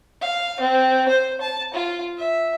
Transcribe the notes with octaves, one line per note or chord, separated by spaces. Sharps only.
F5
C4
C5
A5
F4
E5